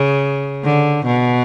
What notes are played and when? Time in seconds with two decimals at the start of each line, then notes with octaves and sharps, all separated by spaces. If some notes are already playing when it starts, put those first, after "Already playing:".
Already playing: C#3
0.64 D3
1.06 B2